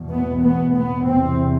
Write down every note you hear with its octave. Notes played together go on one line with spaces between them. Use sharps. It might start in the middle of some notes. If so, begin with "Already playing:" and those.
Already playing: E2 B2
B3
B3
B3
E2 C3 C4